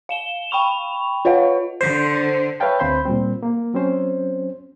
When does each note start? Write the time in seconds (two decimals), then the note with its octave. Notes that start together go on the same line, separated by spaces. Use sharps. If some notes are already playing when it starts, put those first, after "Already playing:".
0.09 F5 E7 G7
0.51 G5 B5 C#6 F7
1.25 F4 B4 C#5 D#5 F5 F#5
1.81 D3 C5
2.60 B4 C#5 E5 F5 G5 A5
2.79 D2 C4 C5 B5 C6 G6
3.06 A#2 G3 C4
3.43 A#3
3.74 F#3 C4 C#4 C5